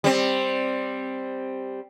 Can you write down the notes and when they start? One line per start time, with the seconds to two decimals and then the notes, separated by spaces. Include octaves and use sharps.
0.04 G3 C4